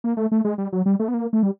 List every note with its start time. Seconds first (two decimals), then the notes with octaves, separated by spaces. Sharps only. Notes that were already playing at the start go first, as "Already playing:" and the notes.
0.04 A#3
0.17 A3
0.32 A3
0.45 G#3
0.58 G3
0.73 F#3
0.86 G3
0.99 A3
1.08 B3
1.14 A#3
1.33 A3
1.43 G3